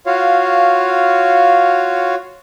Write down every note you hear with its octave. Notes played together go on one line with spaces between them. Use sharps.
F4 F#4 C#5 F5